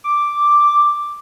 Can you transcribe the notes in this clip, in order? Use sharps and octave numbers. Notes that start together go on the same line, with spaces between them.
D6